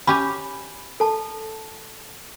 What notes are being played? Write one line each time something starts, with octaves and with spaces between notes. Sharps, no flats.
C#4 G4 G#5 B5
A4 A5